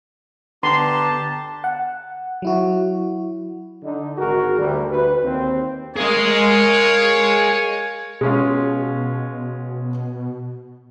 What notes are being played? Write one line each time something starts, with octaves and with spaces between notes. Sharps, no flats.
D3 B3 D4 G4 A5 A#5 C6
F#5
F#3 E4 F#4
D3 D#4
G#1 F#4 G#4 A#4
D2 D3 G3
D2 B4
D#2 C4
G#4 A#4 C#5 D#5 F5
B2 G#3 C#4 F4